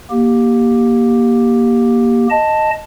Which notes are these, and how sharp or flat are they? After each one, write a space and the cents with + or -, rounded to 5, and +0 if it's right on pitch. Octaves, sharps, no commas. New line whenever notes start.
A#3 +20 G4 +0
D#5 +0 A5 +5